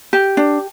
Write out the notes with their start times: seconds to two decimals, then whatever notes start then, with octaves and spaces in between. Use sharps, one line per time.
0.13 G4
0.37 D4